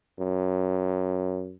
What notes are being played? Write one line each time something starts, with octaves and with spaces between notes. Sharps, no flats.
F#2